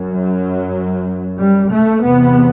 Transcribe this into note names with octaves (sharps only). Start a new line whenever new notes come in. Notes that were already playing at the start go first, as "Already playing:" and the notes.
Already playing: F#2
F#3
G3
A3
E2 C3 B3